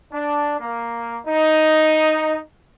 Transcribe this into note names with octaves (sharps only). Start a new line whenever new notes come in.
D4
A#3
D#4